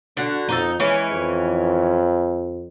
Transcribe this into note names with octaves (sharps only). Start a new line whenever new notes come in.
D3 D4 F#4
F2 D#4 F#4 A4
E3 G#3 C#4
F2